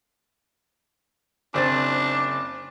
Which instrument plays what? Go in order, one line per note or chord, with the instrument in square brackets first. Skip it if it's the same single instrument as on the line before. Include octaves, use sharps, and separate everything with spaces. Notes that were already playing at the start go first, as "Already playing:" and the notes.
[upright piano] F#1 C4 A6 [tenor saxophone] D4